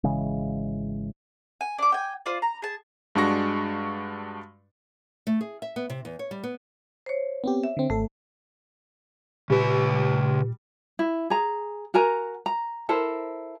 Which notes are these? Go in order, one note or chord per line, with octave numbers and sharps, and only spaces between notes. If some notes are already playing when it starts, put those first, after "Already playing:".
G#1 C#3 E3 G#3
G#5
D4 D6
G5 G#5
F4 C5 D5
A#5
G#4 A5
G2 G#3 D4 F#4 C#6 A#6
A3
G#4
E5
B3
C3
E2
C#5
G3
B3
C5 C#5
B3 C4 G4
E5
D3 C4
G#1 A3 A4
A#2 C#3 G3 B4
E4
G#4 A#5
F#4 A#4 G#5 A#5
A#5
E4 A4 A#4 C5